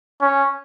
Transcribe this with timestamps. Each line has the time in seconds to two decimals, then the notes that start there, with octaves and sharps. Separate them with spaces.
0.21 C#4